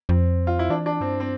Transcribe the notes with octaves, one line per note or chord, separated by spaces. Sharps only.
F2 C4
F4
E4
E3 D4
D4
G2 C4
C4